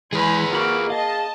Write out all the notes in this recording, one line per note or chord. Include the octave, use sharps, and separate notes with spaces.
E3 G#3 G#4 B4 G#5 B5
A#3 F4 F#4 B5 F6 D7
G#4 D#5 F5 A5